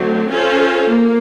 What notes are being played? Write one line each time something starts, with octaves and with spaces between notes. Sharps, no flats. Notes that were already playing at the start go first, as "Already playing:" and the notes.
Already playing: D3 F#3 A3 C4
C#4 F4 A4 C5
A#3